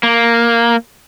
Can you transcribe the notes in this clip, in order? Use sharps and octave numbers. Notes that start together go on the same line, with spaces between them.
A#3